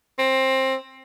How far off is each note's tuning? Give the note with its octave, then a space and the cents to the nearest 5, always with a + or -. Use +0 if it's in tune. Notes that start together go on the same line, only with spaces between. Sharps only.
C4 +20